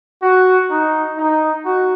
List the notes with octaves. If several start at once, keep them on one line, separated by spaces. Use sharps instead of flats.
F#4
D#4
D#4
F#4